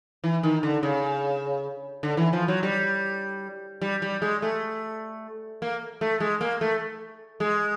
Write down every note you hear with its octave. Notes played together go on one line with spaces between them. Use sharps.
E3
D#3
D3
C#3
D3
E3
F3
F#3
G3
G3
G3
G#3
A3
A#3
A3
G#3
A#3
A3
G#3